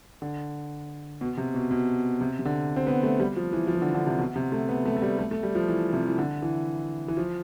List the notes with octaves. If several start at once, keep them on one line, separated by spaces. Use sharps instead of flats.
D3
B2
C3
B2
B2
C3
C3
D3
C4
B3
A3
G3
F3
E3
F3
E3
D3
D3
C3
B2
C3
A3
B3
A3
A3
G3
A3
A3
G3
F3
E3
C3
E3
D3
E3
E3
F3